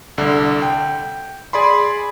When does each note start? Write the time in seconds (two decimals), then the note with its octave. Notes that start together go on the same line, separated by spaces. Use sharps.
0.18 C2 D3
0.62 G5
1.53 G#4 D5 B5 C6